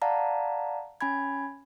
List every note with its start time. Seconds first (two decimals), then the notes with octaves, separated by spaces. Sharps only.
0.02 D5 F5 F#5 A5 A#5
1.01 C#4 G#5 B5 G#6